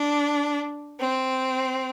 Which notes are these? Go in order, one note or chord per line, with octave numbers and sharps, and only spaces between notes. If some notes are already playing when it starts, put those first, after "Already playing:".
Already playing: D4
C4